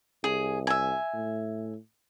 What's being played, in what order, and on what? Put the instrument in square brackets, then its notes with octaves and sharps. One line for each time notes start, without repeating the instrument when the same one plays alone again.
[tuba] C2 [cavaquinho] G#4
[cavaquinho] E5 G#5
[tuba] A2